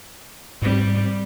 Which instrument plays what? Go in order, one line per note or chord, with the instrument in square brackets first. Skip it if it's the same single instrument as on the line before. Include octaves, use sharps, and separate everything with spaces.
[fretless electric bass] G#2 C4 [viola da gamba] G3